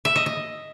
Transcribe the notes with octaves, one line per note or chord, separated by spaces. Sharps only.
E5
D#5
D#5